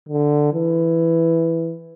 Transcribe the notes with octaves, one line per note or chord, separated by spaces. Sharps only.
D3
E3